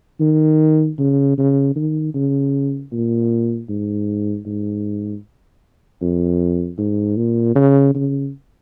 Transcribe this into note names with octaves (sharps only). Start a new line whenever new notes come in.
D#3
C#3
C#3
D#3
C#3
A#2
G#2
G#2
F2
G#2
A#2
C#3
C#3